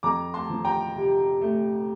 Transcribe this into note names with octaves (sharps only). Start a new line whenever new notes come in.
F2 A#5 D6
A5 C6
F3
G5 A#5
C3
A3